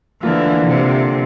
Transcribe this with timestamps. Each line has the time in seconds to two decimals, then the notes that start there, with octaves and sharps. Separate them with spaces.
0.22 D3 E3 F3 A#3 F4
0.68 C3